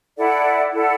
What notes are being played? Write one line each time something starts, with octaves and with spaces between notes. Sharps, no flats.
E4 A4 D5 F#5
E4 A4 D5 F#5